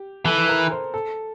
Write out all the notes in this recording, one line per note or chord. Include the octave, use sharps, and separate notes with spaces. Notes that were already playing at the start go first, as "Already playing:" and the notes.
Already playing: G4
E3 A4
A#4
C5
A4